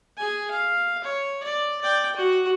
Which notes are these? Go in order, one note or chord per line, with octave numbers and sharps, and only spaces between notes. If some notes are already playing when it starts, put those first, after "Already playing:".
G#4 G#5
F5
C#5
D5
D5 G5
F#4